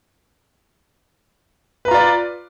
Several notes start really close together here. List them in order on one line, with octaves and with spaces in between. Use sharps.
B4 A#5 F4 D5